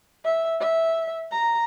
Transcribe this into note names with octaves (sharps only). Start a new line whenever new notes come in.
E5
E5
A#5